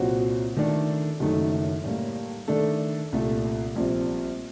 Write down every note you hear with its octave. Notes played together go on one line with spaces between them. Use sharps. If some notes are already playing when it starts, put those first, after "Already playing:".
Already playing: C2 A#2 F#3 C4 F#4
D#3 A3 D4 A4
F#1 F#2 D#3 A3 D#4
A2 G3 A#3
D#3 A3 D4 A4
C2 A#2 A3
A#1 A#2 G3 C4